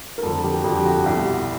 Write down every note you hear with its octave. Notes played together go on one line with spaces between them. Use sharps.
A#4
F2 D3 F3 A4
G4
F#4
F2 D3 F3 G4
G4
F#4
C2 B2 G4